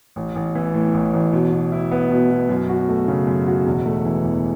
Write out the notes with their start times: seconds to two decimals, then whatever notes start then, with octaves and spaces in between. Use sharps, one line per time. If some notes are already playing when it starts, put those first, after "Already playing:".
0.16 A1
0.36 A1
0.55 E3
0.74 A2
0.94 A1
1.13 A1
1.33 B2
1.52 B2
1.72 E4
1.91 B3
2.11 B2
2.30 B2
2.49 F#2
2.69 F#4
2.89 A3
3.08 C#3
3.27 F#2
3.47 F#4
3.66 E1
3.86 A3
4.05 E3
4.24 E2